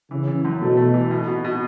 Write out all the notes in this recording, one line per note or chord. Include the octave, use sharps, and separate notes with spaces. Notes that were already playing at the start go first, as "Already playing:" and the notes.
C#3 E3
E3
F#2
B2 A3
A3
E3
B2
B2
B2